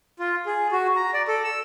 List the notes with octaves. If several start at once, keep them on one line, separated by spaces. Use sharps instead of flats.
F4
G#4
F#4
A#5
D5
A4
E6